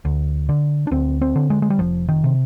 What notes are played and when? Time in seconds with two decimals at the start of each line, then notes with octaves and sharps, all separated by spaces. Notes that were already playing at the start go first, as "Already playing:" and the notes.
0.05 D2
0.49 D3
0.87 D4
0.91 D2 C4
1.21 C4
1.36 D3
1.50 G#3
1.62 G#3
1.70 G3
1.79 F1 F3
2.09 D#3
2.24 C3